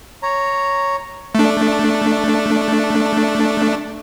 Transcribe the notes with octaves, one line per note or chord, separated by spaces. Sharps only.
C#5 A#5
A3 D4